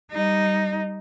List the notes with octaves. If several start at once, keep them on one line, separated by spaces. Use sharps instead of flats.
G3 D#4